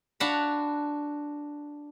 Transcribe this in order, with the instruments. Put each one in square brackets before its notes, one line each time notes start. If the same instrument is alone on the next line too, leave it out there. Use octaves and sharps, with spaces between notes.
[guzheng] D4 F#4 F5 F#5 A5 B5